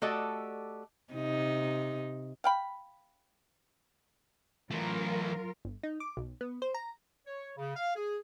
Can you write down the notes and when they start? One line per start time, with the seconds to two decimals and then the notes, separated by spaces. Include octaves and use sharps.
0.02 A3 F#4 G4 A4 D5 D#5
1.14 C3 D#4
2.44 F5 G5 B5
4.71 E3 F#3 A3 F4 A#4
5.65 G1
5.83 D#4
6.00 D6
6.17 B1
6.41 B3
6.62 C5
6.74 A#5
7.26 C#5
7.57 C#3
7.75 F5
7.95 G#4